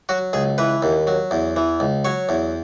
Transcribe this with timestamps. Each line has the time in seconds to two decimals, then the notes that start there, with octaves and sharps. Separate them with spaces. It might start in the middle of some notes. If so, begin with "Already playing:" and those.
0.09 F#3 F#4
0.33 C#2 G#4
0.58 E3 B4
0.82 D#2
1.07 F#3
1.31 E2
1.56 E3
1.80 C#2
2.05 F#3 C#5
2.29 E2